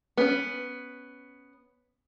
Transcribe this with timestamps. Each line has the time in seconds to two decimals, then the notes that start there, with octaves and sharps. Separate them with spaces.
0.17 B3 C#4